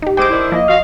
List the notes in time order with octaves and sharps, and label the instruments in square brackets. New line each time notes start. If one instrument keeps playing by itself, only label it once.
[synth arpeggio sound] D#4 G4
[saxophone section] G#2 C3 G#3 [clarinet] C5 [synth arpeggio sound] G5 D7 [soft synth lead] D6
[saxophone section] D#3 D4 E4
[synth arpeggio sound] F3 [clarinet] A#3 [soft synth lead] D#5
[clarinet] F#4 [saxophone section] F5